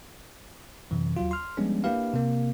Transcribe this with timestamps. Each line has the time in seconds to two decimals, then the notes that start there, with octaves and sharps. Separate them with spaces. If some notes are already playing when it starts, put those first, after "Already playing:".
0.91 F#2 C3 E3
1.17 D#2 F#3 F4
1.31 C6 F6
1.57 F3 G3 G#3 B3 C#4 D4
1.84 A#3 D4 E4 G4 B4 F5
2.14 C3 A#3